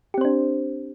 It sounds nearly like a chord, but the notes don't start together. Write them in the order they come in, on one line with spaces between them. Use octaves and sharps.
G4 C4 C5 D4